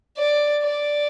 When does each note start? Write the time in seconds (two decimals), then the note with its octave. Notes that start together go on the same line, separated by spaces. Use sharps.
0.18 D5
0.64 D5